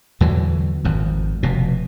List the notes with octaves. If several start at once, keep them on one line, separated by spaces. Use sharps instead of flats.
E2 D3 E3 F#3
G#1 F2
F1 B2